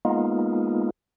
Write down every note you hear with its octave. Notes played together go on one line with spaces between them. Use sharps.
G#3 A#3 B3 D#4 F4